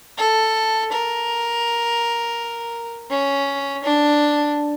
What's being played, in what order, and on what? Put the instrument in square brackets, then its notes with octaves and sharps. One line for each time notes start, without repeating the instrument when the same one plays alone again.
[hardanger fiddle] A4
A#4
C#4
D4